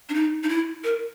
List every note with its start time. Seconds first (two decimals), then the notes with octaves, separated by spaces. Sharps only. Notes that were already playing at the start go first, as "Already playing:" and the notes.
0.09 D4
0.14 D#4
0.43 D#4
0.49 E4
0.84 A#4